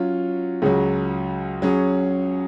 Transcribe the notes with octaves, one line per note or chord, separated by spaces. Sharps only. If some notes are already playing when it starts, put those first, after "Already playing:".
Already playing: F#3 C#4 F4
C#2 C#3 F#3
F#3 C#4 G#4